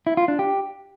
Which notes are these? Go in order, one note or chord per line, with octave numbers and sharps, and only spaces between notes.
E4
F4
D4
G4